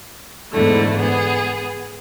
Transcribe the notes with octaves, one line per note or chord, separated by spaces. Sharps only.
E2 G#2 D3 A3 E4
B3 G#4